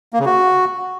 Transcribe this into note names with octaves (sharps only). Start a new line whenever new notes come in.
A#3
C#3
F#4